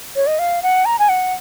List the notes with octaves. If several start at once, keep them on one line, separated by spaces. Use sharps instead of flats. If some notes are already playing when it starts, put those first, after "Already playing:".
C#5
D#5
F5
F#5
A#5
G#5
F#5